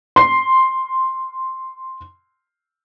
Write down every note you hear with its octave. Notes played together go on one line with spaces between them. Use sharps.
C6 C7